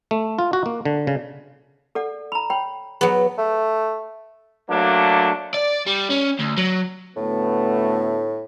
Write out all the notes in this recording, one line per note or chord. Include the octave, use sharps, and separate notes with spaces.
A3
F4
F#4
A#3
D3
C#3
A4 D5 F#5
A#5 B5
C#5 G5 B5
F#3 B3 G#4 C#5
A3
F#3 A3 A#3 D4
D5
G3
C#4
D2
F#3
D2 A2 A3 B3